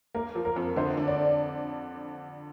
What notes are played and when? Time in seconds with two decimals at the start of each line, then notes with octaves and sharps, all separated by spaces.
0.15 A#3 A#4
0.35 F3
0.45 A#4
0.56 F2
0.76 D3 C5
0.97 D4
1.08 D5